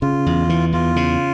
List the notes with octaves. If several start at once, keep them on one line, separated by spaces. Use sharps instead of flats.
C#3 F4
E2
E3
E2 F4
C#3